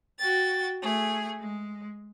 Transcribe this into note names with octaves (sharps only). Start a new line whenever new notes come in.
F#4 G5 A6
A3 G#4
G#3